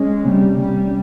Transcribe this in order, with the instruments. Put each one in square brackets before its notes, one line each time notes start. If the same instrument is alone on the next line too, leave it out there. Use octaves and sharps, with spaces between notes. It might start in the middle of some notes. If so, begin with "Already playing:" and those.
Already playing: [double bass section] G#3 [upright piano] C#4
[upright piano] C3 [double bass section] G3
[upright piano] C3 [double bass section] G3
[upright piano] C#4